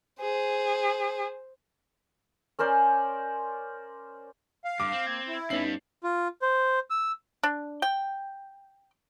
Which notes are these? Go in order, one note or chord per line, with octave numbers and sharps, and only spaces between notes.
G#4 C5
C#4 A#4 C5 D5
F5
G2 D6
C4
A#3 G#6
E4
G2 G3 B3 C#4 D#4 C7 F#7
F4
C5
E6
D4
G5